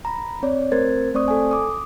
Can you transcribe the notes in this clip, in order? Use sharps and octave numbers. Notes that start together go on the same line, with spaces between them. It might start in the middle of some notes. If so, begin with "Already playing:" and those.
A#5 B5
C4 C#5 D5
A3 C4 A#4 C5 G#6 A6
A3 C4 C5 D5 C#6 D#6
A4 G#5
D6 D#6